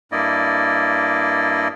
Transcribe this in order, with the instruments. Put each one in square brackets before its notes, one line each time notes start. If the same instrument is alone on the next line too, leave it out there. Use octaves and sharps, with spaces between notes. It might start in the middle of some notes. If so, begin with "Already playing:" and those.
[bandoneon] G2 A#3 E4 D5 D#5